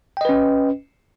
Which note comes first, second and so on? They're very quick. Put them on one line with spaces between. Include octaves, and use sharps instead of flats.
G5 D#5 B4 C#4